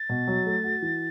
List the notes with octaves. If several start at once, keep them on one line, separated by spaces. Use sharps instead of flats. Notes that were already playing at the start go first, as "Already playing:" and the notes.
Already playing: A6
B2
F#3
A3
F#4
E3